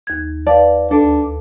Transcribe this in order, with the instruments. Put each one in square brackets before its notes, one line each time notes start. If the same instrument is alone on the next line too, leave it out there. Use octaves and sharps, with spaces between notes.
[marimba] D#2 G#6
[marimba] B4 F5 A5 [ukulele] D5
[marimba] D2 [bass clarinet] D4 [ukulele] A4